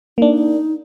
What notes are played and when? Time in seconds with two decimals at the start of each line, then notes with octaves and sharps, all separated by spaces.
0.18 A#3 D4 D#4